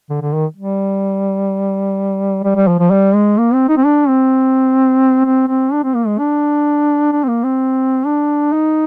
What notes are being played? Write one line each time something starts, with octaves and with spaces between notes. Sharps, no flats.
D3
D3
D#3
G3
G3
G3
F3
F3
G3
G#3
A#3
C4
D#4
C4
D4
C4
C4
C4
D4
C4
A#3
G#3
D4
D4
C4
A#3
C4
D4
D#4